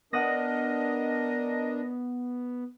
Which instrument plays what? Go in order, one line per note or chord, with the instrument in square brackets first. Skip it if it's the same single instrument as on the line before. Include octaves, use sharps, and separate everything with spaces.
[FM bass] B3 [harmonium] D4 [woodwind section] A#4 D#5 [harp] F#5 D#6 A#6